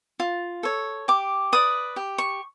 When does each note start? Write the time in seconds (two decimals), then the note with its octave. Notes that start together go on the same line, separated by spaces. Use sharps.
0.20 F4
0.63 A4 C#5
1.08 G4 D6
1.52 B4 D5 D#6
1.96 G4
2.18 C#6